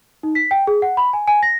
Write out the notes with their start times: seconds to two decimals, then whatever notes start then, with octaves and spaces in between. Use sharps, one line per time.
0.23 D#4
0.35 B6
0.51 G5
0.67 G#4
0.82 F#5
0.97 B5
1.13 G#5
1.28 G#5
1.43 A#6